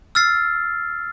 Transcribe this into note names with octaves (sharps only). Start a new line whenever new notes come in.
E6 F6 A6 C7